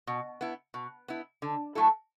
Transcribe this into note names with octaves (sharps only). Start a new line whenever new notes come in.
B2
B3 E4
B2
B3 E4
D3
F#3 A3 E4 A4